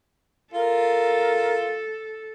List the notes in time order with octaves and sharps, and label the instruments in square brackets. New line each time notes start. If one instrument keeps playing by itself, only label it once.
[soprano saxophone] F4 [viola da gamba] A4 [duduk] A#4